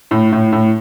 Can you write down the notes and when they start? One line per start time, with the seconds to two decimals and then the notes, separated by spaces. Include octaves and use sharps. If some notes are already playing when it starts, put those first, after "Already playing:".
0.11 A2
0.32 A2
0.52 A2